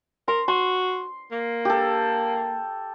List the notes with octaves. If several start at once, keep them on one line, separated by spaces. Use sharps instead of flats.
A#4 C6
F#4 C6
A#3
G4 A4